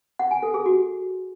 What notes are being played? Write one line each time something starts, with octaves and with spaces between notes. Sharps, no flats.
F#5
G#5
A4
G#4
F#4